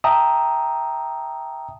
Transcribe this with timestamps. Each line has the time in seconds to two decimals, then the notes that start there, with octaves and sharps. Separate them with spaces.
0.04 E5 G5 A5 A#5 D#6